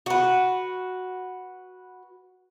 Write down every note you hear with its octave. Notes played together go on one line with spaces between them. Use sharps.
F#4 B4